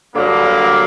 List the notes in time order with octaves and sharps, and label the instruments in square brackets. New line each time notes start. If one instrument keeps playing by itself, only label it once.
[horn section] G2 D3 F#3 A#3